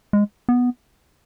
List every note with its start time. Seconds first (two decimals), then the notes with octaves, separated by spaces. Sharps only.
0.13 G#3
0.49 B3